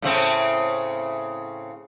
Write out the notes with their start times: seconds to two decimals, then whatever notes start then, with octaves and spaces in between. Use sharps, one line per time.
0.02 A2 C#3 C4